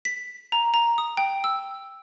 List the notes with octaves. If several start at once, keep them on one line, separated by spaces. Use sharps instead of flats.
B6
A#5
A#5
D#6
G5
E6